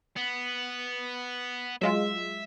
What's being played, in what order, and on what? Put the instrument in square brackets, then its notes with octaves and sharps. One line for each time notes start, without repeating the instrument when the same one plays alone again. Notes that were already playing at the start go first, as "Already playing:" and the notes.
[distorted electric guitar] B3
[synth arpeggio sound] F#3 G#3 F4 [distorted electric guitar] E5